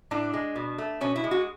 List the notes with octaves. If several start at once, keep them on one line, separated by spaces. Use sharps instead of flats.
A2 D4
G#3
B2
A3
B2 C#4
E4
G#3
F#4